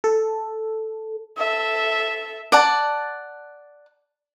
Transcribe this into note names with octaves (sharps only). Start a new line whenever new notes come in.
A4
A4 E5
D5 F#5 A5